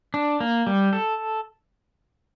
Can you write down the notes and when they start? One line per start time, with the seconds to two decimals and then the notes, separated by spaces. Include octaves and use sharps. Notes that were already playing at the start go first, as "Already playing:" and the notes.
0.14 D4
0.40 A#3
0.67 G3
0.93 A4